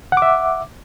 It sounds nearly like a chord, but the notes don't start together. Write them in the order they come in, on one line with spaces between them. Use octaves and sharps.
F#5 D6 E5